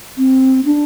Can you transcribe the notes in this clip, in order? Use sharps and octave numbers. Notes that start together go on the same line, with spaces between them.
C4
D4